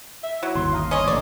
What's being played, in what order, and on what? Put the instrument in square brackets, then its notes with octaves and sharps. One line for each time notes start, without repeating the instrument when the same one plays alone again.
[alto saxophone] E5
[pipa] F#3 [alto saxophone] E4
[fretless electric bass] G1 D#2 [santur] C6
[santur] F5 A#5 D#6
[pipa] C#4 C#5 [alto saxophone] D#5
[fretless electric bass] A1 A2 D3 [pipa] D5